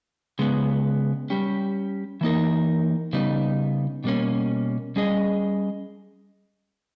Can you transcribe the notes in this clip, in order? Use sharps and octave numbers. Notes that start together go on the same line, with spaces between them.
C#3 G#3 B3
G3 C#4 G4
E3 A#3 D#4 A#4
C#3 G3 B3 D#4
B2 G3 A#3 C#4
G3 C#4 G#4 D#5